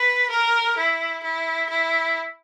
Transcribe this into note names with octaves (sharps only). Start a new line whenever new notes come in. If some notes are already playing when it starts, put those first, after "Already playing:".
Already playing: B4
A#4
E4
E4
E4